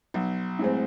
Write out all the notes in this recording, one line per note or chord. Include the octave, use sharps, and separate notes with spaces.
B1
A2 G#3 C4